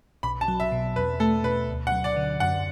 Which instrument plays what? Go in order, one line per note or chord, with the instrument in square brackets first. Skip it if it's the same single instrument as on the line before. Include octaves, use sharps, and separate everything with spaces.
[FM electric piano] B1 [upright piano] B5
[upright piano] A5
[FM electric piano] F#3
[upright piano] E5
[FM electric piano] B2
[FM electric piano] E2 [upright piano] B4
[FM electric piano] A3 [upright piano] A4
[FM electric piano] B2 [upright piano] B4
[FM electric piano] D2
[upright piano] F#5
[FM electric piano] F#3
[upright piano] D5
[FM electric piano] D3
[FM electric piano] F#2 [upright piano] F#5